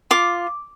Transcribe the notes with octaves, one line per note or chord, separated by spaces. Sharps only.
F4 D6